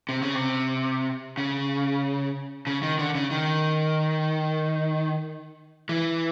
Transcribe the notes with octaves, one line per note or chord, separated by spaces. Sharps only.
C3
C#3
C3
C#3
C#3
D#3
D3
C#3
D#3
E3